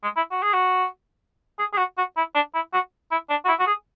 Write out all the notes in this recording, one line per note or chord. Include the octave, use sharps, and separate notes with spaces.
G#3
E4
F#4
G#4
F#4
G#4
G#4
F#4
F#4
E4
D4
E4
F#4
E4
D4
F#4
E4
F#4
G#4